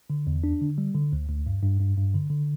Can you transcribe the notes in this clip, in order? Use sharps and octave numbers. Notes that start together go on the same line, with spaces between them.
D3
E2
D4
D3
G3
D3
D2
D2
G2
G2
G2
G2
D3
D3